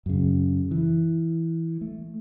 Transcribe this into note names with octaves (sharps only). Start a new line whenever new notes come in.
F#2 C#3
E3
A3